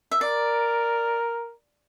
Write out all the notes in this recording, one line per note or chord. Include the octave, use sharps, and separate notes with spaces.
E5
A#4 D5